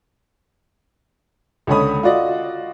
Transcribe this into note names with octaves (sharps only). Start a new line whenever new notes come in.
C#2 D3 A4 C#5 B5 D#6
F4 F#4 D5 D#5